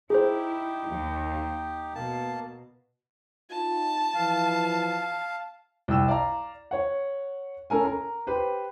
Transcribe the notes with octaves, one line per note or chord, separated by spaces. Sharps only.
D#4 E4 G4 G#4 C5
D#2
B2 A#3 A5
D#4 F4 A5
E3 F3 F5
C2 G5 E6 E7
D5 F5 A#5
C#5 F#5
C#4 A4 A#4 G#5
A#4
G4 B4 C5